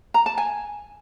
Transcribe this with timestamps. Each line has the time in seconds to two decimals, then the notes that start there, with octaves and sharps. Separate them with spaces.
0.14 A#5
0.26 A5
0.38 G#5